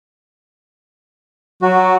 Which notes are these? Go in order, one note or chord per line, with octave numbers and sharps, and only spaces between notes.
F#3 F#4